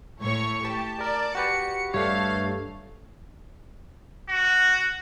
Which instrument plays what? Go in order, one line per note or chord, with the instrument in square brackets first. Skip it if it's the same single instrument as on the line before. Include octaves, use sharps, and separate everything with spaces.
[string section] A2 C#5 C#6
[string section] G4 [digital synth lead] A5
[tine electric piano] A#4 [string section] D5
[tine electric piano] F#4 G4 B4 [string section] C#7
[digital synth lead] G2 [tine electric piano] A3 C#5 [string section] A4 F5
[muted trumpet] F#4